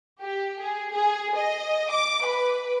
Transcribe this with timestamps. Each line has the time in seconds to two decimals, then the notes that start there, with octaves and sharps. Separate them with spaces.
0.20 G4
0.60 G#4
0.93 G#4
1.36 D#5
1.90 D6
2.26 B4